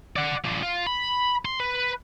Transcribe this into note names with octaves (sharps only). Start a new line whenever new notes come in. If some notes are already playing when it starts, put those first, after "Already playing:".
D5 F#5
D4 F4
F4
B5
C6
B4